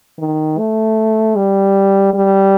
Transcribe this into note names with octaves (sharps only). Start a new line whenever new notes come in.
D#3
A3
G3
G3